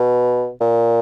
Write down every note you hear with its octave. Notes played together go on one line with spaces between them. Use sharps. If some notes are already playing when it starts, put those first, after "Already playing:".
Already playing: B2
A#2